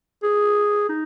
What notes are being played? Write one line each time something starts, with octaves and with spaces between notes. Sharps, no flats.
G#4
D#4